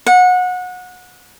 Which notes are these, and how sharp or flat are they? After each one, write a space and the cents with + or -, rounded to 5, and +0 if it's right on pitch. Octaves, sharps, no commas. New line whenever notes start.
F#5 -25